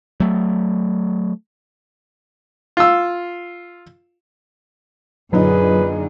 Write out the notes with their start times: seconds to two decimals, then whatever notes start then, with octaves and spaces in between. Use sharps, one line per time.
0.20 F#3 A3
2.77 F4 E6
5.33 F#2 A#2 D3 F#3 D#4 G#4 B4